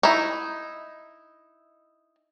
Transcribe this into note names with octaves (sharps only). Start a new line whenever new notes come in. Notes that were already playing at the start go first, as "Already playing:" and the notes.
D#4 E4